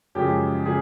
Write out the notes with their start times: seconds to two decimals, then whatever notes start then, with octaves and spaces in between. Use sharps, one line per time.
0.15 F#2 C#3 F3 G#3 G4
0.65 C#3 G#4